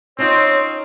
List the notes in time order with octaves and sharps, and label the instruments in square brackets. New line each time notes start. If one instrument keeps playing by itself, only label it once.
[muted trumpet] C4 [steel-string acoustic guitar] C#4 D#4 F4 [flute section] C#5